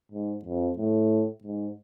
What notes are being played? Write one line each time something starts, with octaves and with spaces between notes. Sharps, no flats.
G#2
F2
A2
G#2